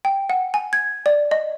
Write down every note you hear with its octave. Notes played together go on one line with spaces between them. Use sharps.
G5
F#5
G#5
G#6
D5
D#5